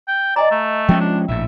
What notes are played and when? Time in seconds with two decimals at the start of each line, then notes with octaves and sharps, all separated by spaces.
0.08 G5
0.36 D5 D#5 G#5 A#5
0.51 A3
0.89 F3 G#3 C#4 G5
1.00 D4
1.28 A#1 A2 E5